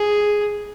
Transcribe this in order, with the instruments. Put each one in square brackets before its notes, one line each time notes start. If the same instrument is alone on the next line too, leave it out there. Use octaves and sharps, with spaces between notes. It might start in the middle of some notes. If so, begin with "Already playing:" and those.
Already playing: [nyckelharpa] G#4